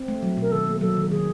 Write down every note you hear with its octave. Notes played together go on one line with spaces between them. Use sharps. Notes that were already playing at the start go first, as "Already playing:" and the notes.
Already playing: C4
A3
F#3
B2 A#4
D#3 A4
A#3
F#3 A4
D#3
D#3 G#4